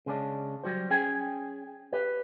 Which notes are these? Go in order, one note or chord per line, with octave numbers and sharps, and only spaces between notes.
C#3 G#3 C#4 D4
F#3 G3 F#4 C5
C#4 G#4 G5 G#5
G4 B4